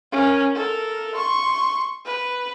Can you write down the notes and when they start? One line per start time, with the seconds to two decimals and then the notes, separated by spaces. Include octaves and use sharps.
0.12 C#4 A#4
0.55 A4 A#4
1.15 C6 C#6
2.05 B4